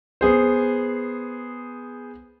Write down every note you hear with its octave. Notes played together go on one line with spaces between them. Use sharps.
B3 G#4 C5